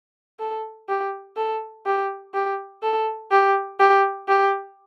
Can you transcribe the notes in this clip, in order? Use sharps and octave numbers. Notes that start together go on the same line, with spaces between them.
A4
G4
A4
G4
G4
A4
G4
G4
G4